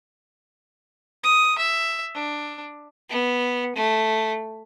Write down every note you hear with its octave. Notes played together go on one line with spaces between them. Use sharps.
D#6
E5
D4
B3
A3